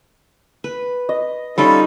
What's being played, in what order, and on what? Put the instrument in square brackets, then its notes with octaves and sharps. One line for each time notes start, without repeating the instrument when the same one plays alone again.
[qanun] B4
[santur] D#5
[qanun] G3 D#4 D#5 [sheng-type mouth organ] C#4 F4 A4 [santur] B5